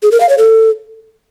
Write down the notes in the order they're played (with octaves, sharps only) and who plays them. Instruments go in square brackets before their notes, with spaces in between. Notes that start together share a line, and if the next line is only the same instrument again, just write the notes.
[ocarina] G#4
A#4
F5
C#5
A4